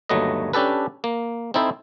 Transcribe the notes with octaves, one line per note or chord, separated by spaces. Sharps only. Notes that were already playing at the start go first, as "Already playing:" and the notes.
G1 D#2 F#3 A3 B4 D#5
C#4 D4 G4 A4 B4
A#3
C4 D#4 E4 A4 C5